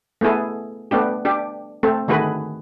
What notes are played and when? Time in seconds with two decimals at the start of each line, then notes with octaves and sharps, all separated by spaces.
0.21 A3 B3 E4 G#4 A4
0.91 A3 B3 D4 G4
1.25 D4 G4
1.83 A3 C4 A4
2.08 D3 D#3 A3 F#4 G#4 B4